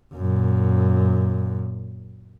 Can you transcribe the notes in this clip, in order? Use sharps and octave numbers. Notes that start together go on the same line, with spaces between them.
F#2 A#2